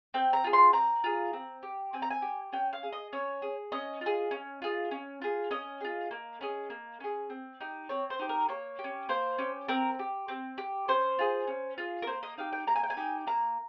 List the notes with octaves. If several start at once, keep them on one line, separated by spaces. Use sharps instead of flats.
C4 G5
A#5
F4 G#4
C6
C4 A#5
F4 G#4
C4
G4
C4 G#5
A#5
G#5
G4
C#4 G5
F5
G#4
D#5
C#4 C#5
G#4
C#4 D#5
F4 G#4
C#4
F4 G#4
C#4
F4 G#4
C#4 D#5
F4 G#4
A#3
C#4 G#4
A#3
C#4 G#4
C4
D#4 G4
C4 C#5
C5
D#4 G4
A#4
A#3 C#5
G4
C#4
A#3 C5
C#4 G4
C4 A#4
G4
C4
G4
C#4 C5
F4 G#4
C#4
F4 G#4
A#4
A#3 C5
D#5
D#4 G4 F5
G5
A#3 A#5
G#5
G5
G#5
D#4 G4
A#3 A#5